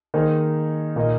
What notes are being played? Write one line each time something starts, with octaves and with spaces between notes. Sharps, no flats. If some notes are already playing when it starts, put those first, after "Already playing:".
D#3 A#3 D#4 G#4 C5
A#2 A#3 D#4 A#4 D#5